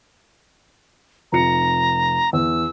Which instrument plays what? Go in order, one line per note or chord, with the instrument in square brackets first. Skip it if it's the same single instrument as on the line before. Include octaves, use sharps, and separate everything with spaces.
[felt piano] F1 F4 C#7 [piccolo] A#5
[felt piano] E2 [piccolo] E6